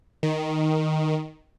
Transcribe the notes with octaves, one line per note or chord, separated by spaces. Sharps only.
D#3